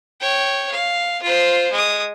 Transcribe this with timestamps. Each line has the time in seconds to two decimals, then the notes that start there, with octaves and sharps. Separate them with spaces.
0.21 C#5 G5
0.71 F5
1.22 F4 C5
1.72 G#3 D#6